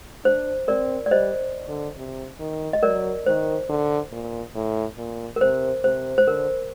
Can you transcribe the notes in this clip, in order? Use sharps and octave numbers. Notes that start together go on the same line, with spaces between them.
D4 C5
C4 A#4 D5
D5
G3 C5 D#5
D3
C3
D#3
D#5
F#3 A#4 D5
D#3 C5
D3
A#2
A2
A#2
A#4
C3 C5
C3 C5
C5
D3 A#4